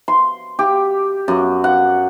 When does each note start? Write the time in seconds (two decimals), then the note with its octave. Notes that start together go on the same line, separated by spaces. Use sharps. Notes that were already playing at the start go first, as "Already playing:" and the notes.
0.08 C6
0.59 G4
1.28 F#2
1.64 F#5